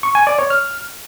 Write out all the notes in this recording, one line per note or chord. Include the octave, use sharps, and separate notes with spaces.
C#6
G#5
D5
C#5
F6